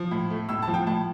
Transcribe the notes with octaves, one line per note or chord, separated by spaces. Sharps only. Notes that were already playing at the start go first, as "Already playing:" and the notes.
Already playing: F3
A2
A3
A2 E6
A5
F3
G5
A2 A5